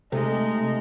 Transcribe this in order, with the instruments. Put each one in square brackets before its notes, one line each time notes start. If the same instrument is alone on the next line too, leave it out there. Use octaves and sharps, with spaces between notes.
[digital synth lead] C3 [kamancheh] G#3 D#4 [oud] A3